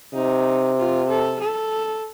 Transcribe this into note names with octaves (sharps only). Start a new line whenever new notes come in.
C3 D#4
F4
A4
A4